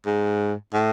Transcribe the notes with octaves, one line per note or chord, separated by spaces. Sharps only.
G#2
A2